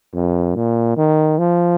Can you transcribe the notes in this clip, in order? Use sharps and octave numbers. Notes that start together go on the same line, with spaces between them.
F2
A#2
D#3
F3